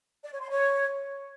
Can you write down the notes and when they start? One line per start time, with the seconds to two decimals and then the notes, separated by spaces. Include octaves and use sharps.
0.24 D5
0.32 C#5
0.41 C6
0.50 C#5